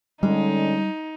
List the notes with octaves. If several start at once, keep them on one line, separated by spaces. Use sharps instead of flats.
D3 G3 G#3 C#4 D#4